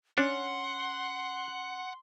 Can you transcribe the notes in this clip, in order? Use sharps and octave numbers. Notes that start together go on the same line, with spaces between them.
C#4 D4 F#5 C6